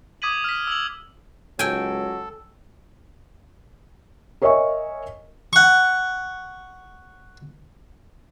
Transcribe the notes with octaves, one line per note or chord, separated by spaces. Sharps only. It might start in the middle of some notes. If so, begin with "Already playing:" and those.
D6 D#6 G#6 B6 D#7 F#7
F6 B6
E6 F#7
C#2 F#3 A4 G5 G#5
A#4 C#5 D#5 E5 G#5 C#6
F#5 C#6